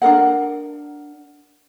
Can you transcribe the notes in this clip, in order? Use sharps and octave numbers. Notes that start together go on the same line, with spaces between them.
D4 F4 A#4 F#5